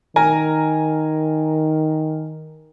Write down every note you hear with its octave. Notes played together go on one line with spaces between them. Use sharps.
D#3 A#4 G#5 A#5